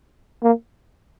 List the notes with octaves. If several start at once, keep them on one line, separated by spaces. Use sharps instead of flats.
A#3